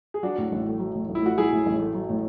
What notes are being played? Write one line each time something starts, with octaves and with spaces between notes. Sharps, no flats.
G#4
F#3 D4 F#4
A2
A1
A3
F#3
A2
A1
E4
A3 F#4
F#3 E4 G#4
A2
A1
A3
F#3
A2